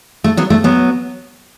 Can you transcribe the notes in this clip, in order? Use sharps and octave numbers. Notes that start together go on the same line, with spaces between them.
A3
F#3 B3
A3
F#3 B3